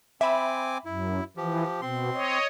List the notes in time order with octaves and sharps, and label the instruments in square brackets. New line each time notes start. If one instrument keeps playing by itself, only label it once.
[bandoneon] C4 G#5 D6 [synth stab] E5 B5
[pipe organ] F#2 [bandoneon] E4
[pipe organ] E3 [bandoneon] F3 G4
[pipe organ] B2 [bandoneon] C4 C6
[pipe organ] C#5 D#5